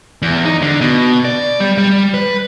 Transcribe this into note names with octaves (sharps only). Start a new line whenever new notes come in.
E2
D#4
D3
B2
D5
G3
G3
B4